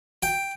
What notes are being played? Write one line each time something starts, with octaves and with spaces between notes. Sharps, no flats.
G5